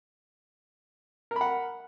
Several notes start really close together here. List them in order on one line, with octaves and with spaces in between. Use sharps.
A#4 B5 F#5